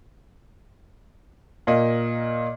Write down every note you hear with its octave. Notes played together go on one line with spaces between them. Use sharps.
A#2 A#3 D#5